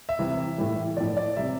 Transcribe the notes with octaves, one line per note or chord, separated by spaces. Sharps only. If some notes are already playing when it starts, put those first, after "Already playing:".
E5
C3 E3 G3
A2 E3 G3
A2 F3 D5
D5
C3 G3 E5